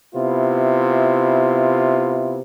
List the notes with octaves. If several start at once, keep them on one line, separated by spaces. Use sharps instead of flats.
C3 B3 E4 F4